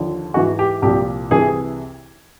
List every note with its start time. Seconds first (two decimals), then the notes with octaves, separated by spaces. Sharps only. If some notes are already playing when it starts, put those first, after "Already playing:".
Already playing: D#2 D3 F3
0.34 G#2 E3 F#4
0.59 G4
0.82 C2 A#2 F3 G4
1.31 C2 C3 E3 G#4